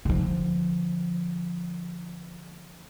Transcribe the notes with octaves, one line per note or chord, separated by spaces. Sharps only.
D3 F3